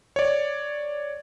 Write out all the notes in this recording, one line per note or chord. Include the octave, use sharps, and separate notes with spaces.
C#5 D5